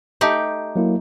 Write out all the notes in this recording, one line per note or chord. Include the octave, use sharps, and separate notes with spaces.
A3 D#4 G4
F#3 A#3 E4